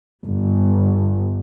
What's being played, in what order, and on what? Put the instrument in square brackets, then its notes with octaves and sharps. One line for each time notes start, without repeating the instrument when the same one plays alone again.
[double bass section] G1